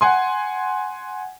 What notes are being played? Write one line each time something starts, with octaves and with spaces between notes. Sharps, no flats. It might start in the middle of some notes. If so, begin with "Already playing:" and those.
F#5 G#5 C6